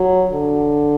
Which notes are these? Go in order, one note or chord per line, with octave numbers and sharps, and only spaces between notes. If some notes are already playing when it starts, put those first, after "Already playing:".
Already playing: F#3
D3